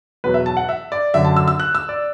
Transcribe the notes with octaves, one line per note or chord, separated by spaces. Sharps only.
E2 B2 F#3 B4
E5
A5
F#5
E5
D5
F#2 D3 F#3 E5
A5
E6
E6
F#6
E6
D5